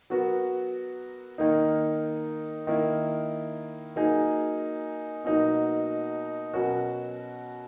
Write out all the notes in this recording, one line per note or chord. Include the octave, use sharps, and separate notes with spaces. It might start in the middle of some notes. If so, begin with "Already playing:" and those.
F#3 B3 F#4 A#4
D#3 A#3 D#4
D#3 A#3 E4
F#3 A#3 D#4 G#4
B2 F#3 A#3 D#4
B2 F#3 C#4 F#4 A#4